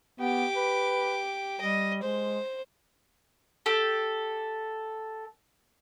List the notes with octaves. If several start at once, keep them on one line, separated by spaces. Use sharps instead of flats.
B3 G4 D6
B4
G3 D#5
G#3 C5
G4 A4